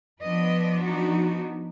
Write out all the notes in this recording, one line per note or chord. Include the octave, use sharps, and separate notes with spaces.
F3 B3 D4 B4 D#5
D#4 F#4